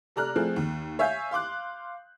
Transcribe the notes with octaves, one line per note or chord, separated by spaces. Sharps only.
C3 A4 D5 A#5 F6 F#6
F3 A3 C4 G#4 A4
D#2
C#5 E5 F5 G#5 G6
F5 C6 D6 F#6